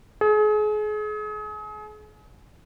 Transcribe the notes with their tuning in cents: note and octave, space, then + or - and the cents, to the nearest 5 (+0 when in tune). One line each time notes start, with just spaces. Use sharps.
G#4 +35